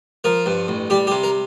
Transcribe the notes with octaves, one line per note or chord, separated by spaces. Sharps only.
F3 A#4
G2
A1
G3 G4
G4
C3
A#4